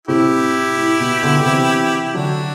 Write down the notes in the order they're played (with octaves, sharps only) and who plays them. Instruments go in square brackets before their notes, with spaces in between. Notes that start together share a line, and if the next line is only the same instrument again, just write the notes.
[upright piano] A2 C3 [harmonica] E4 G4
[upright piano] A2
B2
B2 D3
D3
C3 E3
[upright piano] D3 F#3 [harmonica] D4 F#4